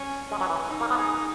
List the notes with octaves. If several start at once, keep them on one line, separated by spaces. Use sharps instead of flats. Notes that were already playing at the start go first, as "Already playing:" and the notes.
Already playing: C#4
G#3 C#4
F#3
E3
D#4
A#3
B3
G#4